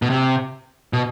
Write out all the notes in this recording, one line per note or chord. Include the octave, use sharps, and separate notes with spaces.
B2
C3
B2